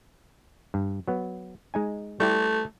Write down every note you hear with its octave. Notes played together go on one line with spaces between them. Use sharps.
G2
F#3 B3
G#3 D#4 G#5
G3 A3 E4 G4